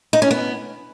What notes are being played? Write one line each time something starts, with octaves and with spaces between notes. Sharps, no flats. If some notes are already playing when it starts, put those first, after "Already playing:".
D#4
C#4
B3